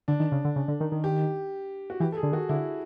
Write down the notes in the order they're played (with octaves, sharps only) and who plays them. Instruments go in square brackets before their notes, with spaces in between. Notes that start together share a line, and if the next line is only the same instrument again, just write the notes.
[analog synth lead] D3 [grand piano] D4
[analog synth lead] D#3
C#3
D3
C#3
D3
D#3
D#3
[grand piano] G4
F#4
[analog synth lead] E3 [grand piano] G4
[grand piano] A4
G#4
[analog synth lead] D3
[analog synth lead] D#3 [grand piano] F#4
[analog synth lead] D3 [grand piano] E4